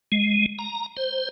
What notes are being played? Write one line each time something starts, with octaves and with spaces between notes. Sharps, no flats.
G#3
A#5
C5